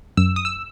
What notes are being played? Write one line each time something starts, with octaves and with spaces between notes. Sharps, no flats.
F#2 E6
D#6
E6